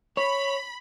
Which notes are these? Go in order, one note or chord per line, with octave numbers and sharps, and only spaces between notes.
C#5 B5